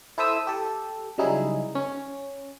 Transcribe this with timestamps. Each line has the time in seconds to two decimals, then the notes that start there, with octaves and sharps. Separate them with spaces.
0.18 E4 A4 C5 E5 D#6 E6
0.47 G4 A4
1.18 C#3 F#3 G3 D#4 E4 G#4
1.75 C#4